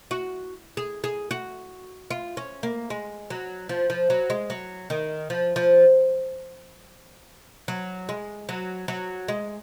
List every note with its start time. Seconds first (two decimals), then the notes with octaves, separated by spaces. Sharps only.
0.11 F#4
0.77 G#4
1.04 G#4
1.31 F#4
2.11 F4
2.37 C#4
2.63 A#3
2.90 G#3
3.30 F#3
3.69 F3
3.90 F3
4.10 F#3
4.30 G#3
4.50 F#3
4.90 D#3
5.30 F3
5.56 F3
7.68 F#3
8.09 G#3
8.49 F#3
8.88 F#3
9.28 G#3